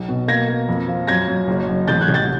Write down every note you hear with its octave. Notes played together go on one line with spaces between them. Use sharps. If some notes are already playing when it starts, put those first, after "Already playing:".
Already playing: B1
B2
A#3 G#6 A#6
A#3
F2
F3
F#2 G#6 A#6
F#2
F#1
F#1
A1 G6 A6
F#6 G#6
A1
G6 A6